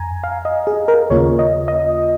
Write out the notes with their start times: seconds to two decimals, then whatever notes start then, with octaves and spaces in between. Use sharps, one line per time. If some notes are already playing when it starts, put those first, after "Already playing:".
Already playing: F2 G#5 A#5
0.24 F5
0.45 D#5
0.67 G#4
0.88 A#4
1.10 D#2 C#3 A#3 F4 C#5
1.39 D#5
1.68 D#5